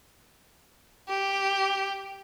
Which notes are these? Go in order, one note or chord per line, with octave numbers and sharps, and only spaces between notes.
G4